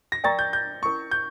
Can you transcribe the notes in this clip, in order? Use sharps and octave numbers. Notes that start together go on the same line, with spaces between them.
A#6
A#4 D5 G5 A#5 C#6 A6
G6
G6
C#4 E4 A#4 C#6
G6